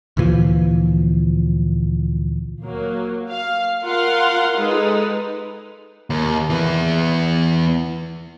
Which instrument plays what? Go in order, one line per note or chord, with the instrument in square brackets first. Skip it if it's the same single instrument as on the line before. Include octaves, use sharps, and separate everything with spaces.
[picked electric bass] D2 A#2 E3 F3
[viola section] F#3 A#3
F5
F4 A#4 F5 F#5 C6
G#3 D#4 A4 B4
[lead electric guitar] D#2
E3 B3